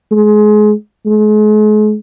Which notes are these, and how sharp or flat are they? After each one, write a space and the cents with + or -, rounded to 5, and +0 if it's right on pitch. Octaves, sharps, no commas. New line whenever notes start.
G#3 +25
G#3 +40